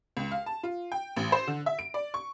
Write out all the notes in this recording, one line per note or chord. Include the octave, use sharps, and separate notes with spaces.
C#2
F5
A5
F4
G5
A1
C5
D3
E5
D7
D5
C#6